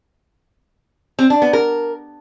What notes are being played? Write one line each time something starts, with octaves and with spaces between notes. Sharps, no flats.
C4
D4
B3
A#4